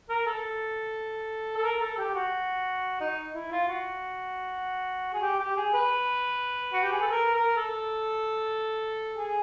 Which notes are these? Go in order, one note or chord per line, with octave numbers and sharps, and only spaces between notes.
A#4
A4
A4
A#4
A4
G4
F#4
D#4
E4
F4
F#4
G#4
G4
G4
G#4
B4
F#4
G4
G#4
A4
A#4
A#4
A4
G#4